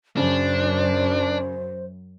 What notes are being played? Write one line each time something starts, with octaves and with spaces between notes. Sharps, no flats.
F#2 C#3 D4 C5